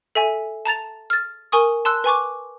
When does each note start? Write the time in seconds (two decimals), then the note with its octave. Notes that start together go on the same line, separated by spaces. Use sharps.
0.15 A4 E5 G#5
0.65 A5 A#5 A6 F7
1.10 F6 A6
1.52 A#4 G#5 C#6 D#6
1.85 A5 C6 E6 F#6
2.04 B4 G#5 C#6 D6